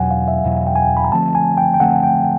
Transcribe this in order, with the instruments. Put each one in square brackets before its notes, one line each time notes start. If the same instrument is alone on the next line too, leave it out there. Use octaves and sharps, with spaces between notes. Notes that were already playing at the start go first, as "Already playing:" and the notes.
Already playing: [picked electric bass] E2 B2 F#3 [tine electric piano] F#5 G#5
[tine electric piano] F5
E5
[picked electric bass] E2 B2 F#3 [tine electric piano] F5
[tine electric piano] G5
G#5
G5
B5
A#5
[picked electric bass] D3 F3 A3 C4 [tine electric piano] A5
[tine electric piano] G#5
G5
G5
[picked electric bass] D3 F3 A3 C4 [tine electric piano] F#5
[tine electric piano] G5